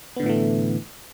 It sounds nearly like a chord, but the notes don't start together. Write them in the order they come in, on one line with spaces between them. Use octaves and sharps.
B3 D3 A2 E3 A3